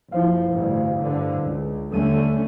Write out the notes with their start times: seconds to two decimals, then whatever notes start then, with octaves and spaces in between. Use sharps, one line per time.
0.12 F#1 F3 E4 C5 F5
0.53 A1 D2 G2
1.00 G2 D3
1.42 C#2
1.93 D#2 D3 G3 A3 C#4 D#7